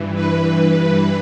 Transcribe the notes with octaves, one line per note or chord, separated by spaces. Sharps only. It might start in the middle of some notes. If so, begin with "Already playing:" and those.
Already playing: G2 E3
B4